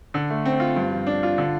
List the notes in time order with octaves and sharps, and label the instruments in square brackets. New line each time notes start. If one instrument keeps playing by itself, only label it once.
[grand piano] D3
A3
C4
F4
G2
F3
D4
F4
D3